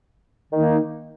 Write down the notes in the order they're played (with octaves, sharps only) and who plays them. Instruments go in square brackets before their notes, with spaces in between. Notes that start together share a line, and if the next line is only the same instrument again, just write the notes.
[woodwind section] D#3 A#3 D#4